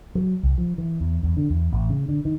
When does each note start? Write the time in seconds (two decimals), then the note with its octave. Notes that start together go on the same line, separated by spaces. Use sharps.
0.15 F#3
0.43 C2
0.58 F3
0.78 E3
1.00 E2
1.23 E2
1.37 D3
1.50 E2
1.72 A1
1.90 C#3
2.09 D3
2.25 D#3